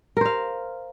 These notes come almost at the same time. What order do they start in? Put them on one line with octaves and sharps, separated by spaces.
A#4 C5 F5